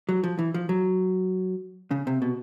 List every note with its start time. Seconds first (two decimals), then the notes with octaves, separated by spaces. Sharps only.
0.09 F#3
0.24 F3
0.39 E3
0.54 F3
0.69 F#3
1.91 C#3
2.07 C3
2.22 B2